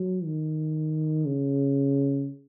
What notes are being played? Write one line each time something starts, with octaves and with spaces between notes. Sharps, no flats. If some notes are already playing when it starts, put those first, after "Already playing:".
Already playing: F#3
D#3
C#3